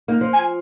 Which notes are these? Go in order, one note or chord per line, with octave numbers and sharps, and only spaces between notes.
A#3 D#4
F3
G#5